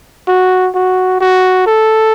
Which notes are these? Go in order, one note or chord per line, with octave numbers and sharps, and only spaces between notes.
F#4
F#4
F#4
A4